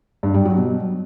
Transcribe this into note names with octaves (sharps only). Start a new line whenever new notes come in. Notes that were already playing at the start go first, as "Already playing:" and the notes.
G2
G3
F#3
B2